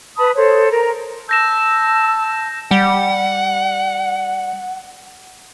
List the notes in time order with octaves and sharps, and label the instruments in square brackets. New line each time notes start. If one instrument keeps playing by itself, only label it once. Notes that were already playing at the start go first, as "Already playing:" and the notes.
[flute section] B4 A5 B5 D#6
A4 C5 C#5
A#4 A#5
[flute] A5 [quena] E6 [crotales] G6 A#6 E7
[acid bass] G3 [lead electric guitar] F#5